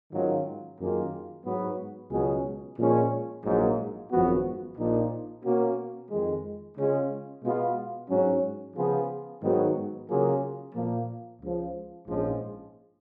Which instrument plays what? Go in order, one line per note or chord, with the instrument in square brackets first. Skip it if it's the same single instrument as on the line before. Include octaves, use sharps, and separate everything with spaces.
[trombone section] G#2 D#3 F#3 C#4 F4
F#2 D#3 A#3 F4 G#4
G#2 F#3 B3 F#4
C#2 B2 F#3 C#4 G#4
A#2 F3 G#3 C#4 G#4
A#1 G#2 F#3 A#3
G#1 F#2 F3 B3 F#4
A#1 A#2 F3 A#3 D#4
B2 A#3 C#4 F#4
F2 D#3 G#3
C#3 G#3 C#4 F4 G#4
B2 G#3 B3 F4
G#2 F#3 C#4
C#3 F3 B3 F4 G#4
G#2 D#3 F#3 B3 F#4
C#3 F#3 A#3 F4 G#4
A#2 F3 A#3
C#2 C#3 F3
A#1 G#2 F3 G#3 C#4